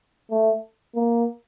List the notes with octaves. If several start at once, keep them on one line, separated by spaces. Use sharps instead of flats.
A3
A#3